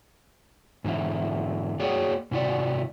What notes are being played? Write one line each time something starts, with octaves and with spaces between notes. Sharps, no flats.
G#2 D3 E3 E4
A#3 F#4 G#4 C#5 D5 G5
G#2 C3 E4 F#4 D5